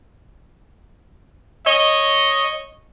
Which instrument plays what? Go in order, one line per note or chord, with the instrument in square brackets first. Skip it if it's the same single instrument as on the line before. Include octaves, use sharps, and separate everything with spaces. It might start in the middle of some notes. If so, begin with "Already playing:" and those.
[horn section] C#5 D#5